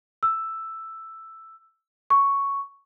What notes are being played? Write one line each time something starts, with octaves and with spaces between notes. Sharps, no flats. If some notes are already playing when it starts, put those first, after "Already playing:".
E6
C#6